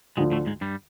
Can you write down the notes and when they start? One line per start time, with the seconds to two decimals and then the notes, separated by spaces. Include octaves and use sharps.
0.17 D2 G#2 D3 F3 G#3
0.32 A2 A3
0.46 G#2 G#3
0.61 G2 G3